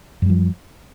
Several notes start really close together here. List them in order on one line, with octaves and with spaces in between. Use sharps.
F#2 G3 F3